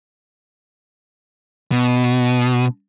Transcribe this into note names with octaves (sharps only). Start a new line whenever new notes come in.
B2